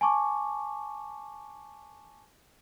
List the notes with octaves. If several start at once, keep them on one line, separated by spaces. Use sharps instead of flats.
G#5 A5 C#6 D6